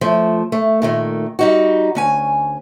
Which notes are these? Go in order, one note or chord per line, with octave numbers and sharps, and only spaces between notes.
F3 A3
A3
A#2 D#3 A3
G3 D#4 F#4
D2 C#4 G#5